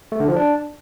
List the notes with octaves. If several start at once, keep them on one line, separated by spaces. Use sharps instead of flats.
A3
D3
F3
D4